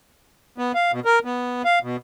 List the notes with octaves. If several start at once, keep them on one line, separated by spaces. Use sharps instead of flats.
B3
F5
B2
A#4
B3
F5
B2